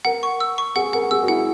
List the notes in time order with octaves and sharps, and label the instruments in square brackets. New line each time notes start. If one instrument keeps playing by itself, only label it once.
[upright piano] A#4 [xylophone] F#5
[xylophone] C#6
E6
C#6
[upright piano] G#4 [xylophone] F#5
[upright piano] A#4 [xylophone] F#5
[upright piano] G#4 [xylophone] E6
[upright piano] F#4
[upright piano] E4 [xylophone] F#5